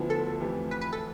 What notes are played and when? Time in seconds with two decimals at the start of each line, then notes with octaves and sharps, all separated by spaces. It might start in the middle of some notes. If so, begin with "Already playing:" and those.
Already playing: D2 D3 F3 B3 E4
0.10 A4
0.41 F2 E3 A3 E4 G4
0.71 B4
0.81 B4
0.93 A4